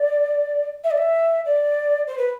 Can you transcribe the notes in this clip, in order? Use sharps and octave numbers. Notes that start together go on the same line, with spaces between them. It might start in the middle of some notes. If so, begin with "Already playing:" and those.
Already playing: D5
E5
D5
E5
D5
C5
B4